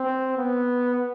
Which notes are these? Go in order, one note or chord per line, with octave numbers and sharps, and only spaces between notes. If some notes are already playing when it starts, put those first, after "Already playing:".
Already playing: C4
B3